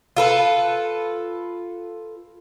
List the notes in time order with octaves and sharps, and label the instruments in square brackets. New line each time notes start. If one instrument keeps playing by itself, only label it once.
[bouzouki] F4 A4 B4